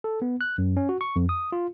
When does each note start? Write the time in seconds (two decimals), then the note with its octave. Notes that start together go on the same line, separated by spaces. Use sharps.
0.04 A4
0.22 B3
0.41 F#6
0.58 F#2
0.77 C#4
0.89 F#4
1.01 C#6
1.16 F2
1.29 D#6
1.52 F4